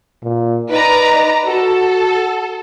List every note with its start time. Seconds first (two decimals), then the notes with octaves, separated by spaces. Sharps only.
0.23 A#2
0.70 D#4 B4 D5 A#5
1.46 F#4 A4